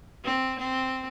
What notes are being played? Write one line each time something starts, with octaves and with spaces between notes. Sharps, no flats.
C4
C4